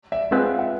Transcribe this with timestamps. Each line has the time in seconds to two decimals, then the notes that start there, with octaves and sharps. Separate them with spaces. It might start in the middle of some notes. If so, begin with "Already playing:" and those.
0.12 D5 E5
0.31 G#3 C4 F4 G#4 B4 F#5
0.46 F5
0.59 E5 F#5